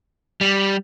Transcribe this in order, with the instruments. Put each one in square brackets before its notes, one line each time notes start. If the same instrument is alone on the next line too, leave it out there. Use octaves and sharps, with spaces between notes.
[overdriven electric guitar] G3